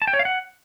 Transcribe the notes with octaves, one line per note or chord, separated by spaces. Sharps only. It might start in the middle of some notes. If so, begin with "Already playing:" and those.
A5
G5
C#5
F5
F#5